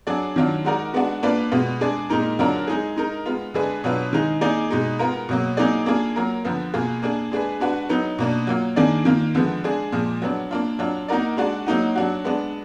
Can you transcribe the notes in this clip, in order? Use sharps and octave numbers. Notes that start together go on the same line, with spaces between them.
F#3 D4 G#4 D5
D#3 F#3 D4 F4
G#3 D#4 F#4 A#4 D5
G#3 B3 D4 F#4
A#3 D4 F4 B4 D5
B2 G#3 B3 F4
G#3 D4 G#4 D5
A#2 G#3 D#4 A#4
D3 F#3 D4 F4 A#4
G#3 D#4 G#4
G#3 D#4 A#4
G#3 B3 F4
D3 G#3 D4 G#4 B4
B2 F#3 D4 F4 B4
D#3 G#3 D#4 G#4
A#3 D#4 G#4 D5
B2 G#3 D#4
G#3 B3 F4 A#4
B2 F#3 A#3
F#3 A#3 D#4 G#4 D5
A#3 D4 F4 G#4
F#3 A#3 F4 A#4
D3 F3 B3
B2 A#3 F4 G#4
A#3 D4 G#4
G#3 D4 G#4 B4
G#3 D4 F#4 B4
F#3 B3 D#4
B2 A#3 D4
F#3 A#3 F4
D#3 A#3 D4 G#4 D5
D#3 A#3 F4
D3 F3 G#3 B3
G#3 D4 G#4
A#2 F3 G#3
F#3 B3 D4
A#3 D4 F4
F#3 D4 F4
A#3 D#4 F#4 A#4 D5
G#3 D4 F#4 D5
F#3 A#3 D#4 F#4
F#3 D4 F#4
G#3 B3 D4